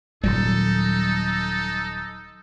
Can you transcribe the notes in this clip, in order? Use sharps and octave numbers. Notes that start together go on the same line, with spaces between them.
D#1 A#2 F#3 G3 D#4 A4